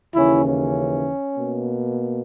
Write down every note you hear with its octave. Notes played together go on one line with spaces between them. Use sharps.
D#2 C#3 E3 C#4 E4
C#4
B2 A#3